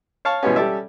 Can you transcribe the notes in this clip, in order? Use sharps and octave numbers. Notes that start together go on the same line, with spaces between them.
C#5 F5 A5 C#6
B2 E3 G3 G#3 B3 C#4
G3 C#4 G4 A4 D5 E5